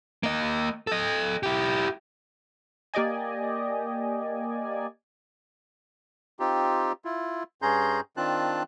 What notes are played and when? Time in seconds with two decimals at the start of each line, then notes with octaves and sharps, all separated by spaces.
0.23 A#3 D#5
0.87 A4 D#5
1.43 E4 G4
2.94 A#3 G4 D5 D#5 G#5
6.40 C4 D#4 F4 G4
7.05 E4 F4
7.62 G2 C#4 G#4 A#5 C6 G6
8.17 D#3 C4 D4 F4 A5 F#6